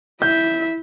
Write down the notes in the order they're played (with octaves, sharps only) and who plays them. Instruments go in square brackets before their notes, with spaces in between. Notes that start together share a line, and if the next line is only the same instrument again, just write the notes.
[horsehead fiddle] E4 E5 [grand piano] G6